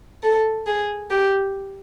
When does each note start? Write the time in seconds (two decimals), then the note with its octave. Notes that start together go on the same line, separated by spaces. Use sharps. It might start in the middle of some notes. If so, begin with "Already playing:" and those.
0.23 A4
0.67 G#4
1.11 G4